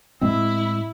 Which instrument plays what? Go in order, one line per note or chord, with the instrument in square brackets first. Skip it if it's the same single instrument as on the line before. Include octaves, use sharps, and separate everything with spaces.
[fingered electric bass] A2 G#3 C4 [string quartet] E4 [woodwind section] E6